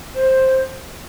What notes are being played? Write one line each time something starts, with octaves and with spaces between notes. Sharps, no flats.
C5